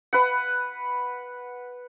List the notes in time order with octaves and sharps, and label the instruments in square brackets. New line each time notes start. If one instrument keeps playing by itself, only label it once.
[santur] B4 F#5